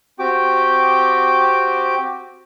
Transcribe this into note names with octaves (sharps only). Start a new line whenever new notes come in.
C4 F#4 G4 G5 D6